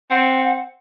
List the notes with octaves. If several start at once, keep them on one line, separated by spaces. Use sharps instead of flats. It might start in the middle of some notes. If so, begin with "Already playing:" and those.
C4 F#5